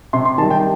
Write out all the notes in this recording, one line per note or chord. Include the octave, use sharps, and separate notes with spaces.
C3 C6
C6
D#3 G3 A5
G5